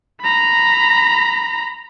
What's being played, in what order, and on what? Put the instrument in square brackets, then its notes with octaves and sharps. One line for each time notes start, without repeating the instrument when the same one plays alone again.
[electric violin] A#5 B5